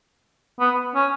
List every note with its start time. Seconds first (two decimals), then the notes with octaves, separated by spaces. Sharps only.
0.60 B3
0.95 C#4